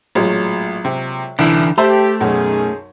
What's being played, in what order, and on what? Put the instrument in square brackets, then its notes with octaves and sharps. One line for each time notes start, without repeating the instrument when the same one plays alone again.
[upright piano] A1 [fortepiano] A#2 F#3 G#3
[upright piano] C3
[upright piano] C2 E4 [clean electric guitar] D3 E3 D4
[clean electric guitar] A3 [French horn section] G4 [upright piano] C5 A5 [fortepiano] E5
[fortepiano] B1 F#2 [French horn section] D#3 C#4 G#4